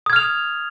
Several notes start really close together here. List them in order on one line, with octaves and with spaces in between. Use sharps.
D#6 G#6 F6 F7